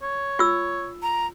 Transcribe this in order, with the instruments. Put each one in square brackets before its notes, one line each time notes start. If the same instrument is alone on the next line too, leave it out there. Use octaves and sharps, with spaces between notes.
[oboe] C#5
[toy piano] F4 E6
[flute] A#5